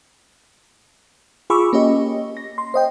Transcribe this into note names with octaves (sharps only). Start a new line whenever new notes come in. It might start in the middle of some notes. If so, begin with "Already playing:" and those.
F4 G#4 B5 C#6 D6 E6
A#3 C#4 G4 D#5
A#6
C6
C5 D#5 G5